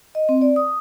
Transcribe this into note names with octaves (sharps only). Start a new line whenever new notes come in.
D#5
C4
D5
D#6